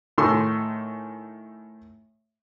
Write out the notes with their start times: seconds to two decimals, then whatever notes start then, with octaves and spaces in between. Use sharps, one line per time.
0.18 A2 D#3 A4 G#5 C6 C#6